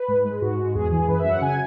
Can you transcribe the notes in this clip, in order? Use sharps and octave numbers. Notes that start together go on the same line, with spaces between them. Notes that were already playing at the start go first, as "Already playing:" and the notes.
Already playing: B4
G#2
G#3
G#2 F#4
G#3
E2 G#4
E3 G#4
F#2 B4
E5
F#3
F#5
C#3 G#5